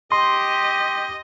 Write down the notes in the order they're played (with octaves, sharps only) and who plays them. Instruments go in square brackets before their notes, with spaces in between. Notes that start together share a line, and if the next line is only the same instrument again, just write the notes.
[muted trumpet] G4 [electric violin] D#5 [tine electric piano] C6